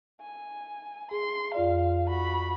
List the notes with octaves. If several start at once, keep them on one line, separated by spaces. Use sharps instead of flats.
G#5
G#4 C6
F2 F4 D5 F5
F#4 B5